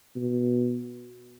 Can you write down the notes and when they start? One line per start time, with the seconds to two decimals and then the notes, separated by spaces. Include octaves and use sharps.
0.16 B2